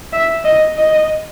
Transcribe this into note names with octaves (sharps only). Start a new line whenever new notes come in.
E5
D#5
D#5